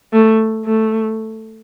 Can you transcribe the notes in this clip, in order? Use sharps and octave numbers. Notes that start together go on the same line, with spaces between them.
A3
A3